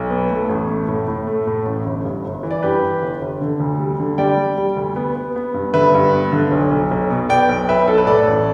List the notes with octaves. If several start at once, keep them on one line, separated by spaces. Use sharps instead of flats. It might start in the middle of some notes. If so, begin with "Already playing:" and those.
Already playing: B1
B3
A3
A1
A3
A2
A2
A3
A2
A1
G1
G2
G1
E3
D5
G2 G4 B4
E3
G1
G1
D3
D2
G3
D3
G3 D5 G5
G3
G3
D2
B3
B3
B3
G2
D3 B4 E5
G2
B3
D3
B1
B1
B1
B2
B3 D5 G5
B1
B1 B4 E5
B1 A4
B4
A2 A4 D5
A1